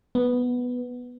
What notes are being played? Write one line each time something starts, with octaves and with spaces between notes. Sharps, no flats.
B3